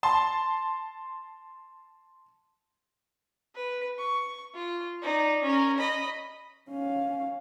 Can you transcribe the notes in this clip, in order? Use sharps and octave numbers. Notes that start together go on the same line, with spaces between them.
A5 C6
B4
C#6
F4
D#4 D5
C#4 A#4
D#5 B5
C#4 F5